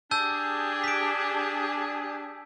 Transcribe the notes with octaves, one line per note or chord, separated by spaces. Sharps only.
D4 G4 G#4 A5 E6 G6
B6 D7